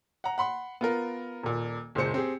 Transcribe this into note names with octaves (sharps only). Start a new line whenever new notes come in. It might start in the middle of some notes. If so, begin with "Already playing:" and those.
F#5 A#5
F#5 B5 C6
B3 F4 A#4
D#1 A#2
F#1 A#2 G#3 C5 C#7
C4 G4 G#4